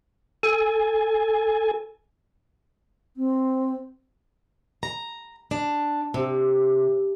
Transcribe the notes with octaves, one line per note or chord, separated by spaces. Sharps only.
A4 G#5
C4
A#5
D4
C3